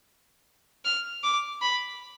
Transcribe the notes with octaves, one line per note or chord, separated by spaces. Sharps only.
F6
D6
B5